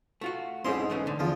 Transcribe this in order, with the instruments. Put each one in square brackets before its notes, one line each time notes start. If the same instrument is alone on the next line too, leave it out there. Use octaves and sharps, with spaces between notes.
[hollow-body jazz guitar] A3 F4 F#4
[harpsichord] B1 G#2 C6 [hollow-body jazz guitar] C4 C#4 E4
[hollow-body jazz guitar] E3 A3 C#4
D3
[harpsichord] E2 F3